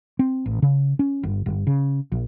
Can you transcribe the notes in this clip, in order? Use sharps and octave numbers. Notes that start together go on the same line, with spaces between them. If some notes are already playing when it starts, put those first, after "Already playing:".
C4
A1
C#3
C#4
G1
G1
C#3
A#1